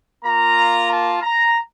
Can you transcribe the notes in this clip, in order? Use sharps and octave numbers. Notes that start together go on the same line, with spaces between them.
A#3 F4 A#5
A5
A#5